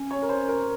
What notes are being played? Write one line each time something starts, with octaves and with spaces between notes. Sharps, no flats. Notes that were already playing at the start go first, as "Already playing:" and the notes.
Already playing: C#4
C#5
A#4
C5
A#4